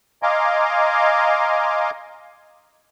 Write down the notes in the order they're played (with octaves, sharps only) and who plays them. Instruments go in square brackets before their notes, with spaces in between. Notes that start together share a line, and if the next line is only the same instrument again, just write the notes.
[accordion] D#5 F5 G#5 A#5 C6 D6